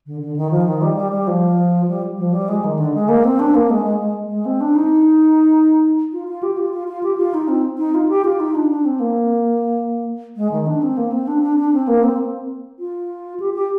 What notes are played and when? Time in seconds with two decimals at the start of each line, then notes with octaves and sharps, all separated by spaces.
0.06 D3
0.21 D3
0.36 D#3
0.51 F3
0.66 D#3
0.82 G3
0.97 G3
1.12 G3
1.27 F3
1.88 G3
2.18 F3
2.33 G3
2.49 G#3
2.64 D#3
2.79 D3
2.94 G#3
3.08 A#3
3.24 C4
3.39 D4
3.55 A#3
3.70 G#3
3.85 G#3
4.00 G#3
4.30 G#3
4.46 C4
4.61 D4
4.75 D#4
6.13 F4
6.28 F4
6.43 G4
6.58 F4
6.73 F4
6.88 F4
7.03 G4
7.18 F4
7.34 D#4
7.48 C4
7.78 D#4
7.94 F4
8.09 G4
8.25 F4
8.40 D#4
8.55 D4
8.70 D4
8.85 C4
9.00 A#3
10.37 G#3
10.51 D#3
10.67 D4
10.82 C4
10.97 A#3
11.12 C4
11.27 D4
11.43 D4
11.58 D4
11.73 C4
11.88 A#3
12.03 C4
12.79 F4
13.40 G4
13.54 G4